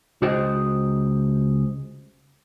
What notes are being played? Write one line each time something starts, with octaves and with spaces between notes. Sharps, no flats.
C#2 F#4 G#4 C5 D#5 G5